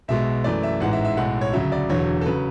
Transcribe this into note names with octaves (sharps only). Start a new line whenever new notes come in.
B1 B2 G#3 E5
F#2 E3 A3 D5
E5
A1 G#2 E3 G#3 F#5
E5
E5
B1 A2 G#3 F#5
C#5
D2 C#3 F#3 E5
D5
E1 E2 D3 F#3 C#5
A4
C#3 F#3 B4